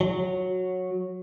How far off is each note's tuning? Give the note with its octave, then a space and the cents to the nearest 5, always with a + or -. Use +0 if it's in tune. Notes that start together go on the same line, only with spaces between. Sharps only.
F#3 -10